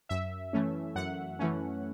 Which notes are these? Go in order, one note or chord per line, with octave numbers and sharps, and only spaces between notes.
F#2 E5
E3 A3 C#4
F#2 F#5
E3 A3 C#4